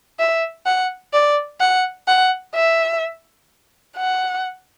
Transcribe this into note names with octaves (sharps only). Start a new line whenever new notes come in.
E5
F#5
D5
F#5
F#5
E5
F#5